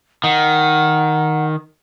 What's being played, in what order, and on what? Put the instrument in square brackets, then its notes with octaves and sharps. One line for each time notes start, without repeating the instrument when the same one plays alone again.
[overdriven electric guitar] D#3 [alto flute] F#5